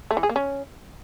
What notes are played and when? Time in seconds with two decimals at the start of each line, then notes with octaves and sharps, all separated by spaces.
0.11 A3
0.17 E3
0.23 G#4
0.29 A#3
0.36 C#4